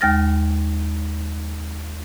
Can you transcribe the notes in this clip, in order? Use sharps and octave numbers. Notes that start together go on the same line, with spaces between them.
D#2 G#3 G5 F6 A6 A#6